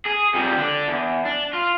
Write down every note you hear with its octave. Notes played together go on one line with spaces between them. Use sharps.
G#4
F2 G3
D3 D4
E2
D4
F4